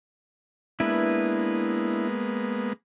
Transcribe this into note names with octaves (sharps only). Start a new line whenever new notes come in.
G#3 A#3 B3 D4 E4 B4